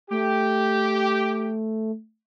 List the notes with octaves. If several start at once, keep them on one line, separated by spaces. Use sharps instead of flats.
A3 G4